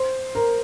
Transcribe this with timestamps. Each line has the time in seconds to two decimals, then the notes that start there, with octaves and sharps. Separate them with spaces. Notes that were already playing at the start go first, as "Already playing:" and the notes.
Already playing: C5
0.35 A#4